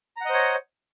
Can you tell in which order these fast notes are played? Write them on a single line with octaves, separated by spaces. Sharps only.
A#5 F#5 D#5 C5 C#5